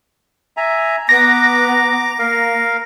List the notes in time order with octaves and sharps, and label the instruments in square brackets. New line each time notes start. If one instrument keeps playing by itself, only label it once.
[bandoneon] E5 G#5 A#5
[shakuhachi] B3 [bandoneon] A#5 D6 [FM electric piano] A#6
[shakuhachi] A#3 [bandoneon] A#4 F5